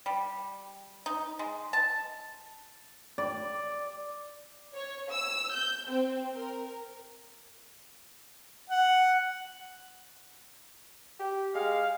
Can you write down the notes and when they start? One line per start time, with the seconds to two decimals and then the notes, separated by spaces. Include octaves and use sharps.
0.06 G3
1.06 D#4
1.39 G#3
1.73 A5
3.18 D5
4.74 C#5
5.11 E6
5.54 G6
5.88 C4
6.34 A#4
8.70 F#5
11.20 G4
11.55 G#3 F5